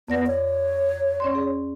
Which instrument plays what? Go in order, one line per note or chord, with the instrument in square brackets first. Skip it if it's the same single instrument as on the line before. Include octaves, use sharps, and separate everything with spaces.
[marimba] F2 D5 A#6 [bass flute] B3
[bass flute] C#5
[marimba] C#4 D5 C6
G#4